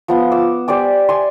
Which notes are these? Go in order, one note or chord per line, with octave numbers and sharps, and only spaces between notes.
F3 B3 F#5
D6 E6
G4 C5 D5 G#5
D5 G#5 C6